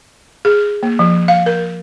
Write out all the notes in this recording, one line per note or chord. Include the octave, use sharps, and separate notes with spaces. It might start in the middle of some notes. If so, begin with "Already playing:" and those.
G#4
A#3
F3
F5
A#4